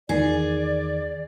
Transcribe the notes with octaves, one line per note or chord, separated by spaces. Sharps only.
E2 D#3 G#4 D5